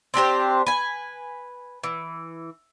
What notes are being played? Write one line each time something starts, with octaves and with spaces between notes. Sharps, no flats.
C4 D4 G4 C5
B4 G#5
E3